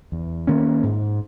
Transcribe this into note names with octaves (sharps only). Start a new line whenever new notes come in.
E2
D#3 A#3 C#4
G#2